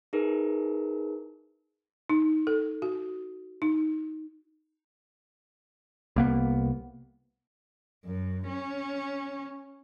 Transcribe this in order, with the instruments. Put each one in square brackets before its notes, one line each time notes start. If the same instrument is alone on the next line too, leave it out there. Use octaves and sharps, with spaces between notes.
[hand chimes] D#4 E4 G#4 A#4 B4
[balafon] D#4
A4
F#4
D#4
[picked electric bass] C2 A#3 B3
[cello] F#2
C#4